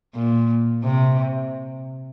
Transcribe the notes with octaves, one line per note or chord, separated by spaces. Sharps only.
A#2
C3